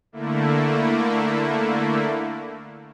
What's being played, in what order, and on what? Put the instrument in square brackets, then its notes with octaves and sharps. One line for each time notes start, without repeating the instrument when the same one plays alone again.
[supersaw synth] D3 A3 A#3 E4